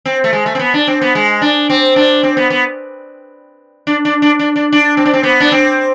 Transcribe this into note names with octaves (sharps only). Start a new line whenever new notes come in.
C4
A3
G#3
A3
C4
B3
D4
C4
B3
G#3
D4
C4
D4
C4
B3
B3
D4
D4
D4
D4
D4
D4
C4
D4
C4
B3
D4
C4